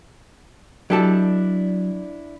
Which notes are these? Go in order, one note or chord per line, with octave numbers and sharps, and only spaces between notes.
F#3 D4 E4 G4 A4 A5